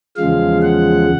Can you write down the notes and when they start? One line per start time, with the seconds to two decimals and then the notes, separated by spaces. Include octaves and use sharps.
0.16 E2 C#3 F3 G#3 F5
0.63 F#5